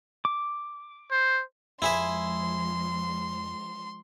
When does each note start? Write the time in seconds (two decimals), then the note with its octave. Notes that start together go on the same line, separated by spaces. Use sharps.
0.25 D6
1.11 C5
1.82 F2 F3 G#3 E4 G#4 E5 C6